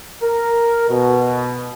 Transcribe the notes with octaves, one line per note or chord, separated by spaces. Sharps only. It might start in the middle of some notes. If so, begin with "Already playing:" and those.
A#4
B2